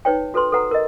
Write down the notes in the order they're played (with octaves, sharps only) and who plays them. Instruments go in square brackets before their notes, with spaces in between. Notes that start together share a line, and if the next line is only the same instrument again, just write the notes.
[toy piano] D#4 B4 C#5 G5
F#4 A4 B4 C6
A4 B4 F#5 A#5
A#4 D#5